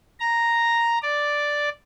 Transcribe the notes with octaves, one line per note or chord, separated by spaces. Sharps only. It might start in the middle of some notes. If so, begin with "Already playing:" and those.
A#5
D5